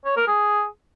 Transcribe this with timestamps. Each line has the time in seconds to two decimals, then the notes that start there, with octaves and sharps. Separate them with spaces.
0.05 C#5
0.16 A#4
0.28 G#4